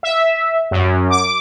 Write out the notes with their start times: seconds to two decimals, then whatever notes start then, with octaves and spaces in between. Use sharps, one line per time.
0.03 E5
0.71 F#2
1.10 D6